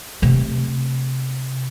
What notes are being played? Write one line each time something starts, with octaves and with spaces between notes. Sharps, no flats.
C3 A3